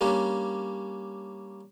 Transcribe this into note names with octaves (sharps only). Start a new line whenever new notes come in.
G3 A#3 C#4 D4